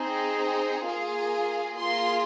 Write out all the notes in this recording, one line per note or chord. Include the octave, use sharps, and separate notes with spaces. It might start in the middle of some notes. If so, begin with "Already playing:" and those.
Already playing: C4 D#4 G#4
A#3 F4 G#4
A#3 F4 G#4 C6